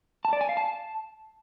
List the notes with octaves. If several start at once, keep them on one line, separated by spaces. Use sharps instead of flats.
A5
D5
G#5
F5
A5